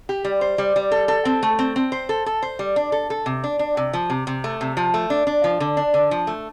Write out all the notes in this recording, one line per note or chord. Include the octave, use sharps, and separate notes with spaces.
G4
G3
C5
G3
G3
A4
A4
C4
A3
C4
C4
C5
A4
A4
C5
G3
D4
A4
A4
C3
D4
D4
C3
F3
C3
C3
A3
C3
F3
A3
D4
D4
F3
D3
D4
D3
F3
A3